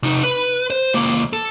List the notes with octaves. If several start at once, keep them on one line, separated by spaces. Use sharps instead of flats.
C3 D#4
B4
C5
C#2 A#3
A4